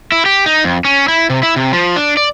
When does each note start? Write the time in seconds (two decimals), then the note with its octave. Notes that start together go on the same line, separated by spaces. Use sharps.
0.12 E4
0.26 G4
0.46 D#4
0.64 F2
0.85 C#4
1.08 E4
1.30 C3
1.43 E4
1.56 C3
1.73 F3
1.96 D4
2.17 D5